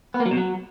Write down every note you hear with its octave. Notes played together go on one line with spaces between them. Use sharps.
B3
A#3
F#3
B2
F#3